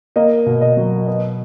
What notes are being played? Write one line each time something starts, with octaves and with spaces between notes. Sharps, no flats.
A#3 D#5
B2
D#5
F#3
B3 D#5